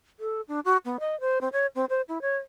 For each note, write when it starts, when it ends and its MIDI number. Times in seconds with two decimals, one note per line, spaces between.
0.20 0.41 69
0.48 0.60 62
0.65 0.77 66
0.85 0.97 59
1.00 1.19 75
1.21 1.41 72
1.41 1.49 60
1.53 1.67 73
1.75 1.85 60
1.90 2.01 72
2.08 2.21 64
2.22 2.37 73